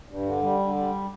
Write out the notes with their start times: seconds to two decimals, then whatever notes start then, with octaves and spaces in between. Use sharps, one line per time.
0.09 G2
0.26 D3
0.42 G3
0.59 D3
0.75 G3